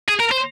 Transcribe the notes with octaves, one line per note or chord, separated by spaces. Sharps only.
G#4
A#4
C5